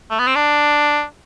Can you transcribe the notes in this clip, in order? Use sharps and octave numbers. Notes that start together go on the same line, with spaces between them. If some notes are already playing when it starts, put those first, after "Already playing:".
A3
B3
C4
D4